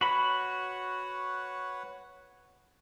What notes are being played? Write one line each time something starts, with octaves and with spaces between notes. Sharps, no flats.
F#4 B4 C#5 F#5 B5